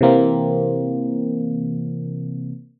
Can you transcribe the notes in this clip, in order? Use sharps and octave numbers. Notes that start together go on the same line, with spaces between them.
C3 E3 A#3 C4